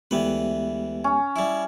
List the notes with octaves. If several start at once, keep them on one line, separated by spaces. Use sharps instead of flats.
D2 E3 G#3 B3 G4 B4
C#4
G3 E4